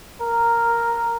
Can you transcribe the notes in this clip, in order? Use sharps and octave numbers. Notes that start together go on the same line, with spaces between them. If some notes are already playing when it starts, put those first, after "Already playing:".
A#4